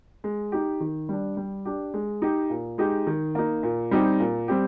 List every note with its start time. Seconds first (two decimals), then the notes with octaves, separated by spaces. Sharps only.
0.24 G#3
0.52 D#4 G4
0.80 D#3
1.09 G3 D4
1.37 G3
1.65 D4 G4
1.94 G#3
2.22 D#4 G4
2.50 A#2
2.78 G#3 D#4 G4
3.07 D#3
3.35 A#3 D#4
3.63 A#2
3.91 G3 C4 D#4 G4
4.20 A#2
4.48 G3 C4 G4